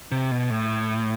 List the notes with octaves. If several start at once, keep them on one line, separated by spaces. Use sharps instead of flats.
C3
B2
A2